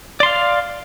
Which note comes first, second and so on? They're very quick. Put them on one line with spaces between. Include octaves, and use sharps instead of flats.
D5 C6 F5